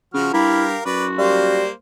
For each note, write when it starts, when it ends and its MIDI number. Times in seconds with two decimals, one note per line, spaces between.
0.14 0.31 49
0.14 0.30 53
0.14 0.30 66
0.14 0.30 89
0.34 0.75 43
0.34 0.65 64
0.34 0.82 67
0.34 0.82 70
0.34 0.82 77
0.85 1.64 42
0.85 1.65 66
0.85 1.06 71
0.85 1.06 74
1.19 1.67 55
1.19 1.71 58
1.19 1.71 72
1.19 1.71 77